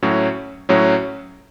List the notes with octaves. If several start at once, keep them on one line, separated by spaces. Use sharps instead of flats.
A2 F#3 C#4
A2 F#3 C#4